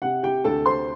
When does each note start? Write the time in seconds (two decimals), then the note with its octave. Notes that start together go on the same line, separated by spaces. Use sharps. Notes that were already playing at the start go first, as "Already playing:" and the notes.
0.02 C3 F#5
0.23 G4 G5
0.44 D2 A4 A5
0.66 C5 C6